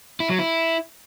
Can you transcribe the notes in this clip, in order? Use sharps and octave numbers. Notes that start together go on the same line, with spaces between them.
E4
F#3
E4